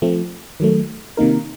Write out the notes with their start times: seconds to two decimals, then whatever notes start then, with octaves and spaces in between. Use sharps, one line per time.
0.02 F3 A3 C4
0.60 D#3 F#3 A3
1.17 C3 D#3 A#3 D#4 A#4